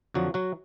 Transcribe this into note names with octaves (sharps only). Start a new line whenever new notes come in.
F2 D3 F3 F#3 F#4
F#3 F#4